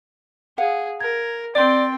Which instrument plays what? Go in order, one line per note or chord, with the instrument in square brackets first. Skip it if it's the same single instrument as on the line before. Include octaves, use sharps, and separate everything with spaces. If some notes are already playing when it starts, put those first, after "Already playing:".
[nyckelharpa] G#4 [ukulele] F5 F#5
[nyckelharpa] A#4 [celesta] G#6
[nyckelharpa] C4 G5 [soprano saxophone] D5 [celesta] C6 A6